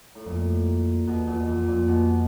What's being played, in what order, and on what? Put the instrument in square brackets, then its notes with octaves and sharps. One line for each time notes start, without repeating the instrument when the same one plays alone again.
[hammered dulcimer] A2
[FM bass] F2 [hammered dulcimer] A#2
[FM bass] E2 [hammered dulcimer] B2
[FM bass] E2 [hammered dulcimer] A#2
[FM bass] F2 [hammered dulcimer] A#2
[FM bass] F2 [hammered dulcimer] A#2
[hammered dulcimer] B2